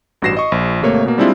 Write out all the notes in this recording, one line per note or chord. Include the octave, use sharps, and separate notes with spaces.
A1 G2 F#4 A#6 C7 E7
D#5 C#6
A#1
G#1 C3 A3 A#3 C#5
B2 A#3
G3 G#3 C4 D4 E4 F4